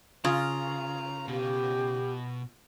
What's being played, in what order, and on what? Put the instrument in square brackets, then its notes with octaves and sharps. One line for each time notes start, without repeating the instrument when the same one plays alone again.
[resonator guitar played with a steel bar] C#3 [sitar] F4 [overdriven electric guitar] A#5
[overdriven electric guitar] B2 [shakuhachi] G4